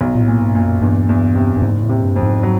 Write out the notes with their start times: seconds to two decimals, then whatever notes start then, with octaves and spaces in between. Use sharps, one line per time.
0.01 B1
0.15 A#2
0.21 A2
0.28 A#2
0.41 G#2
0.53 G2 A#2
0.61 F#2
0.81 E2 G2
1.09 E2
1.35 C3
1.57 G2
1.62 F#1 G#2
1.82 A2
1.89 C3
2.03 G2
2.16 F2
2.23 G#2
2.43 F#3